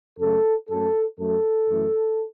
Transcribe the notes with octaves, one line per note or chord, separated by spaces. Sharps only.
F#2 C#3 F#3 A3 A4
F#2 F#3 A3 A4
F#2 F#3 A3 A4
F#2 E3 A3